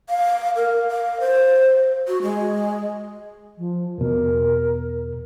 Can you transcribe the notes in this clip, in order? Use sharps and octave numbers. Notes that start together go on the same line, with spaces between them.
F5
A#4
F5
C5
F#4
G#3
F3
E2 B2 A#4